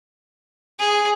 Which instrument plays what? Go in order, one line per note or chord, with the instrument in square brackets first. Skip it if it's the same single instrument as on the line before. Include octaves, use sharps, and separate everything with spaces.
[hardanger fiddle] G#4